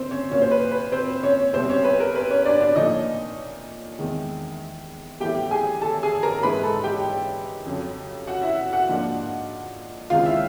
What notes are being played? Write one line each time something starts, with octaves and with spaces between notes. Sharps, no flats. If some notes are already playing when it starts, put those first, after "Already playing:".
Already playing: C4 C5
C#4 C#5
A#2 F#3 A#3 C#4 C#5
C5
B4
B4
C4 C5
C#4 C#5
C2 B2 G3 C4 C5
C#4 C#5
B4
A#4
B4
C#4 C#5
D4 D5
D4 D5
A#2 F3 A3 C#4 D#4 D#5
E2 C3 D#3 G#3
A2 E3 G3 B3 G4 G5
G#4 G#5
A4 A5
G#4 G#5
A#4 A#5
G#2 E3 G#3 B4 B5
A4 A5
G4 G5
F2 C#3 F#3
F#4 F#5
E4 E5
F#4 F#5
G#2 F3 A#3 D4
C#2 C3 D#3 G#3 F4 F5
E4 E5